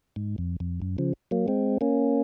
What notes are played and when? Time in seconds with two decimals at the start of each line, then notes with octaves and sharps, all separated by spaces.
0.16 G#2
0.38 F2
0.60 F2
0.82 F#2
0.98 C#3 F3
1.31 F#3 A#3
1.48 G#3 C4
1.81 A#3 C#4